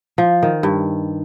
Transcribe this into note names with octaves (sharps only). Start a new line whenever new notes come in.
F3
D#3
G2